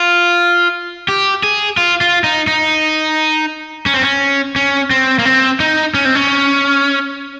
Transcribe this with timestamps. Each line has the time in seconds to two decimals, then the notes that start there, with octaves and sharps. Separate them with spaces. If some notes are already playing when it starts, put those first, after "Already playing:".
Already playing: F4
1.08 G4
1.43 G#4
1.77 F4
2.01 F4
2.24 D#4
2.47 D#4
3.86 C#4
3.94 C4
4.02 C#4
4.56 C#4
4.91 C4
5.19 A#3
5.25 C4
5.60 D#4
5.94 C#4
6.05 C4
6.15 C#4